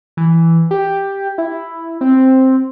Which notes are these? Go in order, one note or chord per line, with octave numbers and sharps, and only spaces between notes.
E3
G4
E4
C4